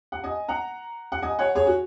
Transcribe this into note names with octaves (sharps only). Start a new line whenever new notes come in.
F#5
D#5 G#5
F#5 A#5
F#5
D#5 G#5
C#5 F#5
G#4 C#5
F#4